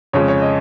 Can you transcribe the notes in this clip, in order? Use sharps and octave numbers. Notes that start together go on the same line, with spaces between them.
F2 C#3 G#3 C#5
C#5
D#5